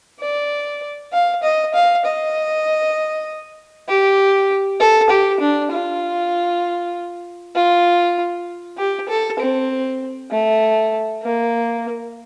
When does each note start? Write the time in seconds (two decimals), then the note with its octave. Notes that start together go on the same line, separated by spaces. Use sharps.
0.20 D5
1.13 F5
1.43 D#5
1.74 F5
2.05 D#5
3.89 G4
4.80 A4
5.10 G4
5.40 D4
5.72 F4
7.55 F4
8.78 G4
9.09 A4
9.39 C4
10.31 A3
11.23 A#3